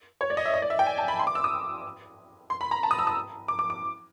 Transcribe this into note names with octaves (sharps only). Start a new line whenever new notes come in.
C#5
D5
D#5
E5
D#5
D5
E5
G5
G#5
A5
B5
C6
D6
E6
D#6
C6
B5
A#5
A5
D#6
E6
D#6
D6
D6
D6